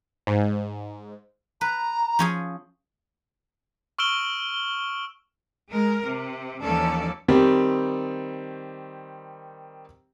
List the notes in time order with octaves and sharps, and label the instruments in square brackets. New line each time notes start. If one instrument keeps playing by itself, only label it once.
[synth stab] G#2
[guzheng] B4 [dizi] A#5
[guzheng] F3 C#4 G#4
[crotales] C#6 E6 F6 D7 E7 G7
[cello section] G#3 A#4
C3
D#2 E3 F3 C#4 A4 D5
[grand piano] D#3 G3 C4 G4